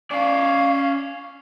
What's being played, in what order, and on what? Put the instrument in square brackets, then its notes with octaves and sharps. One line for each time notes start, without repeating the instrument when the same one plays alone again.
[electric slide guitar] C#4 D5 [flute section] F5